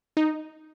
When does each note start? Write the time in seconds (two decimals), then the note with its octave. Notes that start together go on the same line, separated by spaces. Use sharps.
0.17 D#4